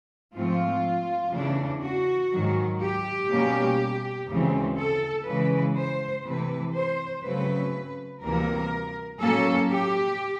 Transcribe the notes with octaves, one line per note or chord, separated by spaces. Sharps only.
G#2 F3 A3 C4 F4
E2 C#3 E3 A3 D4
F#4
G#2 D#3 F#3
G4
B2 G3 A#3 C#4
D2 C#3 E3 G#3 C4
A4
C#3 E3 G#3 B4
C5
C3 E3 A3 B4
C5
C#3 F#3 A3 C4 B4
D2 C3 E3 G3 A#3 A#4
A2 F#3 A#3 C#4 A4
G4